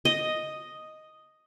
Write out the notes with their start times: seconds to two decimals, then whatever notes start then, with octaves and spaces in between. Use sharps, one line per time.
0.05 D#5